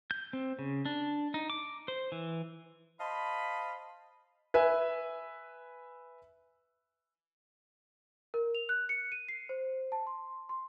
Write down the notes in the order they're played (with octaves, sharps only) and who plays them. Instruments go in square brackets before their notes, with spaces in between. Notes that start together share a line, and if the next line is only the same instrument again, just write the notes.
[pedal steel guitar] G6
C4
C#3
D4
D#4
D6
C5
E3
[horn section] C5 D#5 F5 A5 B5
[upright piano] B4 E5 G#5
[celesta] A#4
F7
F#6
C#7
D#7
C7
C5
A5
C6
C6